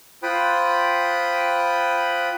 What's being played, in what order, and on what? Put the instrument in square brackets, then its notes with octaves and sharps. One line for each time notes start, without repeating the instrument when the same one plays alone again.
[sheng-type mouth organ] F4 C5 G5 B5 D#6 F#6